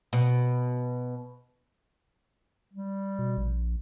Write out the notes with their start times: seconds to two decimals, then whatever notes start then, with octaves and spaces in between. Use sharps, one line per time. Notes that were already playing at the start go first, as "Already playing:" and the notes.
0.13 B2
2.74 G3
3.19 B2
3.37 A#1